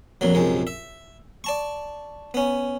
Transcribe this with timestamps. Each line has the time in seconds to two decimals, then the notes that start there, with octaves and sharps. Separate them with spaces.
0.21 A#1 F2 A#2 F#3
0.35 A#1 F#2 C3 G#3
0.67 E5
1.44 D5 A5 C#6
2.34 B3 C#4